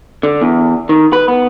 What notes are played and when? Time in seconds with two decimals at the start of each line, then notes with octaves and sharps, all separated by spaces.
0.23 D3
0.42 E2
0.89 D#3
1.13 B4
1.28 B3